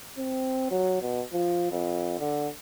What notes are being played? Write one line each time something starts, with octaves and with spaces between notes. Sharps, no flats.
C4
F#3
B2
F3
F2
D3